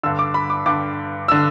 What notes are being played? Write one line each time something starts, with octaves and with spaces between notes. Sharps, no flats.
G2 D3 E6
D6
B5
D6
G2 D3 D6
D3 E6